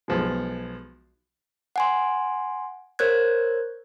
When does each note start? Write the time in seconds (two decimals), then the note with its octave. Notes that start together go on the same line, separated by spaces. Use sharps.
0.08 B1 F3 G#3
1.76 F#5 G#5 C6
2.99 A#4 C5 C#5 F#6 G#6